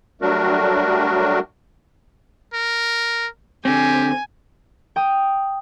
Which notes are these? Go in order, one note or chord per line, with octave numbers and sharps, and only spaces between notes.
F#3 G3 A3 D4 F#4 A#4
A#4
D3 C4 G4 G#5
G5 D#6